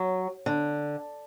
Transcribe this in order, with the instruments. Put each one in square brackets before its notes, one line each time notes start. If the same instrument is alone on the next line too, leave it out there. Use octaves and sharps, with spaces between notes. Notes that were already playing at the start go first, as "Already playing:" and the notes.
Already playing: [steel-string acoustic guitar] F#3
D3